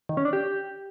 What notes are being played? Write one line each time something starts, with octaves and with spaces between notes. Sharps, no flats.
D#3
C#4
D4
G4